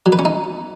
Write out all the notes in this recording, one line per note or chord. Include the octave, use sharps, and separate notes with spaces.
F#3
B4
C#4
D#4